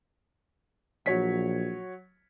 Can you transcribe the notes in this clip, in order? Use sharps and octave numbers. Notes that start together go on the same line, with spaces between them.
A#1 F#3 C#5 B6